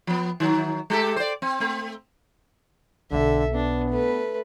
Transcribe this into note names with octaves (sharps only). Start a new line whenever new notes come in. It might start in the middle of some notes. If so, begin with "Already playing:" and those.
F3 B3
D#3 F#3
G#3 G4 A4
C5 D5
C4
A3 C4
B1 B2 D3 A4 E5
B3 D4
A3 B4